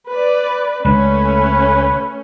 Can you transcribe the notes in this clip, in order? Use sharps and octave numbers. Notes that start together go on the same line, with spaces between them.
B4 D5
C#2 A3 C#4 B4